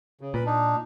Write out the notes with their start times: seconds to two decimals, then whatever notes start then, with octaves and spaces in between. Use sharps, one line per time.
0.21 C#3
0.34 A#2 B4 B5
0.46 D4 D#4